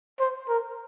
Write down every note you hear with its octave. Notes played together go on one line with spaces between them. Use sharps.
C5
A#4